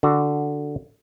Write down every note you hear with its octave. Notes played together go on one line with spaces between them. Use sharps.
D3 F#4